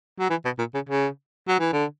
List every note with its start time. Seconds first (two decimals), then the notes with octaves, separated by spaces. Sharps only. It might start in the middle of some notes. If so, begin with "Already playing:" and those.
0.19 F#3
0.30 E3
0.45 B2
0.59 A#2
0.74 C#3
0.89 C#3
1.48 F#3
1.60 E3
1.72 D3